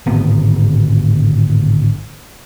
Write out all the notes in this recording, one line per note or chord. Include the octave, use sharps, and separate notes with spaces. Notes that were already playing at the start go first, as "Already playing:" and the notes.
D1 G#1 B3